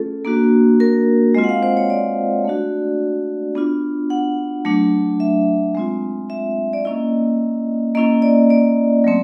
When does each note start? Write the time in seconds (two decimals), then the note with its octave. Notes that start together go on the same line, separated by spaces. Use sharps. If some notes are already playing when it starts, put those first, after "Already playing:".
Already playing: A3 C#4 F4 G#4 A4
0.25 A#3 D4 F#4
0.80 A#4
1.35 G#3 C4 F4 D#5
1.44 F#5
1.49 F5
1.63 C5
1.77 C#5
1.90 D5
2.45 A3 D4 F#4
3.55 B3 D4 F4
4.10 F#5
4.65 F#3 A3 D4
5.20 E5
5.75 G#3 C4 F4
6.30 E5
6.73 D5
6.85 A#3 C#4 E4 D#5
7.95 A#3 C#4 E4 D#5
8.22 D5
8.50 D5
9.04 F#3 A3 C4